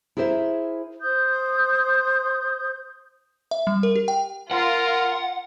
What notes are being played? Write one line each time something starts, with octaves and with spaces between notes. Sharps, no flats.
E4 G#4 A#4 C5 E5
C5 D#6 G6
E5
G3
A#4
G4
G5
F4 A#4 F#5